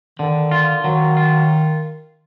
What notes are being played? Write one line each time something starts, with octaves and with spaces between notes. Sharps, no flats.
D3 D#3
F4
D#3 F#3
F4